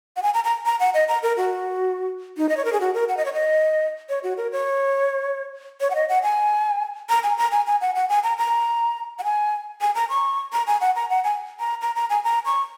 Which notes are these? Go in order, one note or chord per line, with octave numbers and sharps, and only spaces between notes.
F#5
G#5
A#5
A#5
A#5
F#5
D#5
A#5
A#4
F#4
D#4
D#5
C#5
A#4
G#4
F#4
A#4
F#5
D#5
C#5
D#5
C#5
F#4
A#4
C#5
C#5
F#5
D#5
F#5
G#5
A#5
G#5
A#5
G#5
G#5
F#5
F#5
G#5
A#5
A#5
F#5
G#5
G#5
A#5
C#6
A#5
G#5
F#5
A#5
F#5
G#5
A#5
A#5
A#5
G#5
A#5
C#6